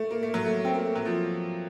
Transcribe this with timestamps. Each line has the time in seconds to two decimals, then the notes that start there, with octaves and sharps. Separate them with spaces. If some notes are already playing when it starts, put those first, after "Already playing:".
Already playing: A3
0.11 A#3
0.23 A3
0.34 F#3
0.45 A3
0.65 C4
0.74 A#3
0.85 A3
0.95 F#3
1.05 F3